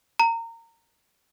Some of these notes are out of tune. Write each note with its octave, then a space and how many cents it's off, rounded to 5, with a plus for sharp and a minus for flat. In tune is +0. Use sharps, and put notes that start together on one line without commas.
A#5 -25